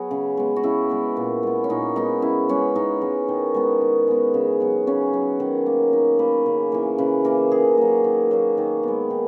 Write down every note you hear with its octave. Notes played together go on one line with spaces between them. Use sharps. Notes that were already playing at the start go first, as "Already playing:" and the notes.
Already playing: F#3 B3 F#4 G#4
C#3
G#3 B3
F#4
C#3 E4
G#3 B3
A#2
G#3 B3
C#4
A#2 D#4
G#3 B3 D#4
C#3 E4
G#3 B3 C#4
C#3 D#4
G#3 B3
D#3
G#3 B3
D#3
G#3 B3
C#3
F#3 B3
C#3 C#4
F#3 B3
D#3
A#3
D#3 D#4
A#3 B4
C#3
E3 A#3
C#3 B4
E3 A#3 A#4
D#3 G#4
F#3 A#3
D#3
F#3 A#3
D#3
G#3 B3
D#3